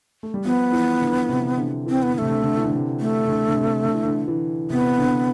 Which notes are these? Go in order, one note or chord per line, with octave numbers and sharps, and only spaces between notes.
A3
G3
F3 B3
E3
D3
C3
D3
E3 C4
B3
D3 B3
C3 A3
D3
D3
E3
D3
C3
A3
D3
D3
C3
D3
E3
D3
E3
C3 B3
D3